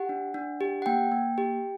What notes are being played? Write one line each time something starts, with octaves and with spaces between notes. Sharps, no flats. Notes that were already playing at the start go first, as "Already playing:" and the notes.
Already playing: G4 F#5
D4
D4
G4
F#5
A#3 G5
A#3
G4